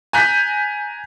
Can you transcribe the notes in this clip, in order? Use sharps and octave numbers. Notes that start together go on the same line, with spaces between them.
G#5 A#5 F#6 G6 B6